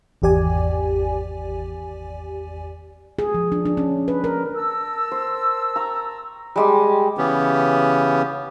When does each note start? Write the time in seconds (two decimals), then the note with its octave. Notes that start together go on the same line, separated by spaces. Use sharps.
0.22 G#1 E2 G4 D5 G#5
3.19 G#4
3.34 F3
3.52 D4
3.66 D4
3.77 C#4
4.08 B4
4.24 A#4
4.55 A#4 A5 E6
5.11 C5
5.76 A#5 C#6
6.56 G3 G#3 G4
7.18 C#3 E3 B3 C#4 G4